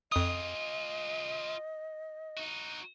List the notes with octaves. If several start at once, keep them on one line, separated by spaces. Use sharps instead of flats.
F2 F4 G#4 D#5 D#6
D#4 F#4